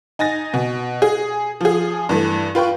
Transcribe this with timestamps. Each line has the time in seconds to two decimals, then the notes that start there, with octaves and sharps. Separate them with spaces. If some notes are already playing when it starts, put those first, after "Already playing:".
0.19 D#4 G#5 A6 A#6
0.54 B2
1.02 G#4
1.61 F3 G#4
2.09 G2 E3 A3
2.55 F4 B4 G5 C#6